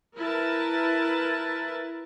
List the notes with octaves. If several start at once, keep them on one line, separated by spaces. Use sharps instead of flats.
E4 A#4 B4 A5